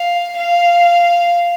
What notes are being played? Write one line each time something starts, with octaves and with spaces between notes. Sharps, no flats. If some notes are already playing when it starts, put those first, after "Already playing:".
Already playing: F5
F5